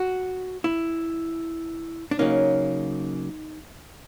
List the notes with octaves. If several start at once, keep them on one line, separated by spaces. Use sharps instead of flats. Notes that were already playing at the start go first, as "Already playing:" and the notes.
Already playing: F#4
E4
D4
C#3 F#3 A#3 C#4 D#4